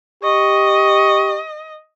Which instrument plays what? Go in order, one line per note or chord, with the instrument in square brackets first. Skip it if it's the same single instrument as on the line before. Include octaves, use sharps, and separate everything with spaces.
[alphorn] G4 [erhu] D#5 [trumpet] C#6